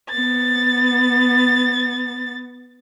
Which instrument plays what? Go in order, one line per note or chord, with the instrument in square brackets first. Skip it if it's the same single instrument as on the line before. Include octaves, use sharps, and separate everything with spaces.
[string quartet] B3 A6